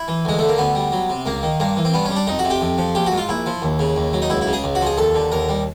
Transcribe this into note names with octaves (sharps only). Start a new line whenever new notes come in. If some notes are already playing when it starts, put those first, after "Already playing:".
Already playing: E4
E3
D2 G#3
D3 A3
A#3
D2 B3
G3
F#3
C3
C#2 A#3
D#3
G2 A#3
E3
C4
G2 B3
C#4
G3
D4
F2 D#4
F#4
C3
G4
F2
F3
A#1 G4
F#4
G#2
F4
A#1 E4
F3
D#2
C#3
D#2
F#3
D#4
C#2 E4
E4
C#3
G#4
C#2
F#4
F3 G#4
D#2 A4
D3
D#2 A#4
G3